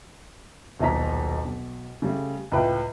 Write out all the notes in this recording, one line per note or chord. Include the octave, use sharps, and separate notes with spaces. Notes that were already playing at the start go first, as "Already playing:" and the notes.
D#1 B1 D#4 A#5 B6
B1
C#3 G3 A3
C#2 A2 F4 B4 G5